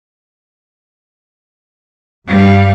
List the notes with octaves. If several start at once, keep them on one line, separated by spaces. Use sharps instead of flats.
G2 G3 F5